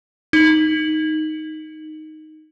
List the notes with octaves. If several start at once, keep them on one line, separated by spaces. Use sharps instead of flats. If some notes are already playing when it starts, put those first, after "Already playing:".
D#4 F#7